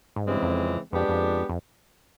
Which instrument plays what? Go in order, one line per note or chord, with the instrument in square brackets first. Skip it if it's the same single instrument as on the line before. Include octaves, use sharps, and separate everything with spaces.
[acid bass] G#2
[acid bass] G2 [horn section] C#3 E3 G#3 C4
[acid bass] F2
[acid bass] F2 [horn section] G#3 B3 D4 G4
[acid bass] F2
F2